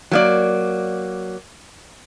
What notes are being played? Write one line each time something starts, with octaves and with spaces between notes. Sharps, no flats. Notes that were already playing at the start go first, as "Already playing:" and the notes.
F#3 A#3 D5